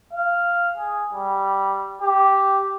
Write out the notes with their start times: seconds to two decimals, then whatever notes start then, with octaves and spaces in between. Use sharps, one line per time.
0.13 F5
0.77 G#4
1.13 G3
2.02 G4